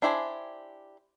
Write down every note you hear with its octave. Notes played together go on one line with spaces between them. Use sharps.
D4 E4 G4 C5 G#5